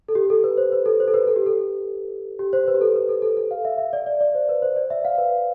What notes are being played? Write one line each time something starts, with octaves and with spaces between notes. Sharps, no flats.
A4
G4
A4
B4
C5
B4
A4
C5
A4
B4
A4
G4
A4
G4
C5
B4
G4
A4
B4
A4
A4
A4
F5
E5
E5
D5
D5
D5
C5
B4
C5
D5
E5
F5
B4